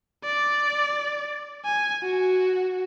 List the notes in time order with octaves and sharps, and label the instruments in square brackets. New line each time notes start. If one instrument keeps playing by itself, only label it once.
[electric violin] D5
G#5
F#4